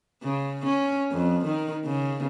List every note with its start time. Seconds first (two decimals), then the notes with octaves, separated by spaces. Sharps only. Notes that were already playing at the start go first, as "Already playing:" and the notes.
0.24 C#3
0.66 C#4
1.12 F2
1.45 D#3
1.85 C#3